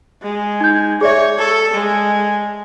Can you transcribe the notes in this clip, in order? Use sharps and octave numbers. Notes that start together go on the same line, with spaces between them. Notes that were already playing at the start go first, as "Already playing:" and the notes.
G#3
D#4 G6
G#4 C#5 D5 E5
A4
G#3